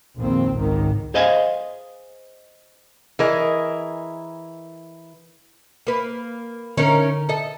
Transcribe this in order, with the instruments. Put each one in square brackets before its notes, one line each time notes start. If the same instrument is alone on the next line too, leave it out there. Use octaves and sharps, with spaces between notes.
[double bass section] A#1 F2 D#3 C4
G#1 C#2 G#2 D#3
[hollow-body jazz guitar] G#4 C5 D#5 F5 G#5
[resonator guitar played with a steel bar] E3 G#4 A#4 D#5
[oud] A#3 B4
[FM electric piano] D3 [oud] C#4 D#4 A#4
[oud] A4 D#5